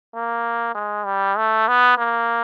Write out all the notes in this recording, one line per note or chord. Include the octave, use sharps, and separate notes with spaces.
A#3
G#3
G3
A3
B3
A#3